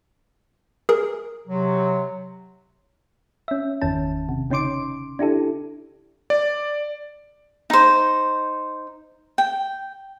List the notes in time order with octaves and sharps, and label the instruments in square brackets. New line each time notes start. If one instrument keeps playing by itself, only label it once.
[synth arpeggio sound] G#4 A#4
[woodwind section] C3 F#3
[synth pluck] C#4 E5
G1 E2 D#3 C#4 A5
C3
C#3 C#4 D#4 C6 D6 D7
D4 E4 G4 A4
[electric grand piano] D5
[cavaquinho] D#4 C5
G5